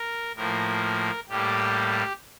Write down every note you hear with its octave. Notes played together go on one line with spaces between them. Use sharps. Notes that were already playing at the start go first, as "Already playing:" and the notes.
Already playing: A#4
A2 F3 A#3 A#4
A2 G3 A#3 G4